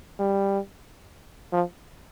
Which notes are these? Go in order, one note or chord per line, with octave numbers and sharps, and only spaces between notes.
G3
F3